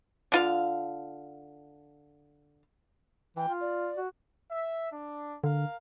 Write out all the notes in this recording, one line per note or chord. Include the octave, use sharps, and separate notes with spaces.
D3 F4 F5
E3 G5
F4
D5
F#4
E5
D4
D3 A#4 F5